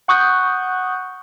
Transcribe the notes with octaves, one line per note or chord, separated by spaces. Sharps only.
F#5 C#6 D#6 F#6 G6